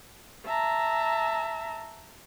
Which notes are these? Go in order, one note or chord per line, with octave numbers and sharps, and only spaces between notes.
E5 A5 A#5